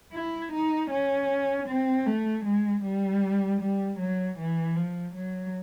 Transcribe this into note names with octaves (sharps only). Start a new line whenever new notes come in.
E4
D#4
C#4
C4
A3
G#3
G3
G3
F#3
E3
F3
F#3